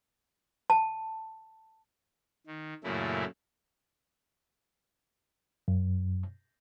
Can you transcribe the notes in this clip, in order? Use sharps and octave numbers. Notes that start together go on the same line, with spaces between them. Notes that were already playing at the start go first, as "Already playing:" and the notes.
A5
D#3
F#2 A#2 C#3 A3 E4
F#2